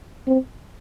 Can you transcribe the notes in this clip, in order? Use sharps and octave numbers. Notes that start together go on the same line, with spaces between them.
C4